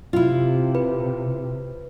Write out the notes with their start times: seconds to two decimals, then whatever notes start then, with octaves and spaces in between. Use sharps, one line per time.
0.13 C3 E4 F4
0.75 B4